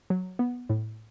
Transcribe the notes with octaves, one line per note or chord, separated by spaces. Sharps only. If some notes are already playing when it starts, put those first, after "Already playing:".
F#3
B3
A2